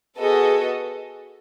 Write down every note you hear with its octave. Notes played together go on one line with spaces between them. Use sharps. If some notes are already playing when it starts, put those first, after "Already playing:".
B3 F#4 G#4 A4 D#5